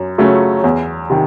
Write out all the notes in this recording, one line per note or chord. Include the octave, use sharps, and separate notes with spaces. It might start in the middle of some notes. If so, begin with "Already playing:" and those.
Already playing: F#2
C#3 F#3 A3 C#4
E2
C3 D#3